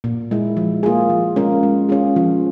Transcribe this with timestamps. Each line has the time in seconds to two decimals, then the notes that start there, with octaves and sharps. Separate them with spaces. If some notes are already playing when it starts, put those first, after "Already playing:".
0.04 A#2
0.31 G#3 E4
0.57 F3
0.83 A#3 F4 G#4
1.10 F3
1.36 G#3 C#4 F4 A#4
1.63 G#3
1.89 C#4 F4 G#4
2.16 F3